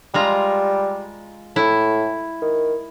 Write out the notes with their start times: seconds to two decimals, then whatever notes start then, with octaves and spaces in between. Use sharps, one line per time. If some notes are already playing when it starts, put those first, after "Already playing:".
0.14 G3 G#3 F4 A#5
1.56 A2 E4
2.42 D#3